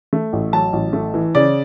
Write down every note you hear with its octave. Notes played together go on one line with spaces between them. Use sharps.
A3
A1
F#3 A5
A1
A3
E3
C#3 D5